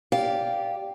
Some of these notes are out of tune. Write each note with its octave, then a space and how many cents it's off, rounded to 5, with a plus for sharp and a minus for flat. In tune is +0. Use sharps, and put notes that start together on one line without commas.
G4 +0 D5 -15 F5 +0